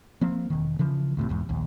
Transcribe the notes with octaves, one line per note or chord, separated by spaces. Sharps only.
F3 A#3 C4
E1 D#3
C#3 E3 F3
D2 A2 C3
E1 E2 G#2
A#1 D#2